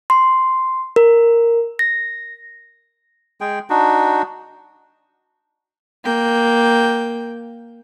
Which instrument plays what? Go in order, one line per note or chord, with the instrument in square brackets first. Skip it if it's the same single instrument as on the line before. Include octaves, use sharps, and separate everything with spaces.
[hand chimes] C6
A#4
A#6
[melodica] G#3 G#4 G5
D4 D#4 F#4
[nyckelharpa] A#3 G5